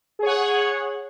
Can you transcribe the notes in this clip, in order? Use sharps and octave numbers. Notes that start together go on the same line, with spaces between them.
G#4 C#5 F#5